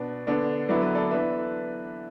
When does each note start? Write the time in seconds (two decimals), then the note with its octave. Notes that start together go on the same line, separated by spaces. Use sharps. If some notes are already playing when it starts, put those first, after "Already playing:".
Already playing: B2 B3 D4
0.27 D3 B3 D4
0.69 D3 F#3 B3 E4 D5
0.82 B4
0.95 A4 D5
1.11 E3 B3 D4 B4 E5